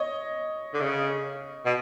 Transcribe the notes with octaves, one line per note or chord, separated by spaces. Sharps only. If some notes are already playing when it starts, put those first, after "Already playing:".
Already playing: C#5 D#5
D3
C#3
B2